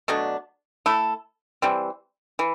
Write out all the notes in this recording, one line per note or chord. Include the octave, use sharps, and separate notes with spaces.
B2 F#3 A3 D4
A3 E4 A4
E3 G3 C4
E3